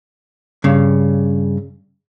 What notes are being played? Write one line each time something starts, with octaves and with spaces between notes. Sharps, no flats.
G2 C#3